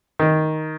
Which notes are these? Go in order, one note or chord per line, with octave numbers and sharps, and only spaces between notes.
D#3